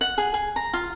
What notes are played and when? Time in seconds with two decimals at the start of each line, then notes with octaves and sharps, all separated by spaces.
0.01 F#5
0.18 G#4
0.34 G#4
0.56 A#5
0.73 F4